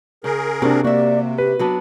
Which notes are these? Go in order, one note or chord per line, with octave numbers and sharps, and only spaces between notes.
C#3 G#4 A#4
C3 A#3 C4 D4 F#4
C3 A#3 F#4 D5 E5
G4 B4
F#3 B3 D4 F#4